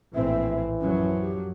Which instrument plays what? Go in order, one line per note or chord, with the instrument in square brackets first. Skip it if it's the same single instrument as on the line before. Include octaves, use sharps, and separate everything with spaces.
[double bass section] A#1 A2 C4 [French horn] E3 [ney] E5
[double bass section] F#2 F3 F#3 [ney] C#4
[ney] G4